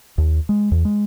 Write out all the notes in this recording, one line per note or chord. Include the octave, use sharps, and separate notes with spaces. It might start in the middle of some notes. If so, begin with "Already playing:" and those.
D#2
G#3
E2
G#3